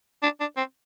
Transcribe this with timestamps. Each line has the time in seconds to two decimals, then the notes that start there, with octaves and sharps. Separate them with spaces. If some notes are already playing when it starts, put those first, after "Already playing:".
0.23 D4
0.40 D4
0.57 C4